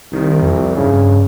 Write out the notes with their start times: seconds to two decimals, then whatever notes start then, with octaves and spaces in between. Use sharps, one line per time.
0.13 C2 D#3
0.43 F2
0.77 G2 C#3